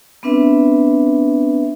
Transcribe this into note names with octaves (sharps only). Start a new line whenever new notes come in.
B3 C4 D4 B4 E5